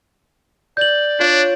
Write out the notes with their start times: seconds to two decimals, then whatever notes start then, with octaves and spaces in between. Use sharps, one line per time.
0.77 D5 G6 F#7
1.20 D4 F4 C#5